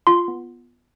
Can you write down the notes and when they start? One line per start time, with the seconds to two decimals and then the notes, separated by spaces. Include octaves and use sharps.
0.07 F4 C6
0.28 B3